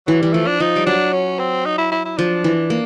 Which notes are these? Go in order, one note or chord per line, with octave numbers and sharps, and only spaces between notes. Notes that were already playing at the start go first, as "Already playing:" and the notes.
E3 F#3
E3 G3
F3 A3
D4
F3 D#4
G3
F#3 D4
C#4
C4
D#4
E4
E4
E4
F3 D4
E3
A#3